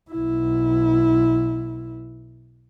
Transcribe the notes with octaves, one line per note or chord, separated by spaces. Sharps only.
B1 E4